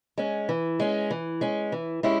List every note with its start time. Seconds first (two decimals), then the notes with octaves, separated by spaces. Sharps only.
0.18 G#3 C#4
0.49 E3
0.80 G#3 C#4
1.11 E3
1.41 G#3 C#4
1.72 E3
2.03 G#3 C#4 E4 G4